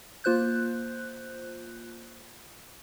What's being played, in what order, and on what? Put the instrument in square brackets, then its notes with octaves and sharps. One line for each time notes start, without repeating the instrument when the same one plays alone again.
[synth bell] A#3 F4 C5 F#6 G6